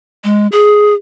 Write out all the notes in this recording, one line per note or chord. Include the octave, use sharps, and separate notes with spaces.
G#3
G#4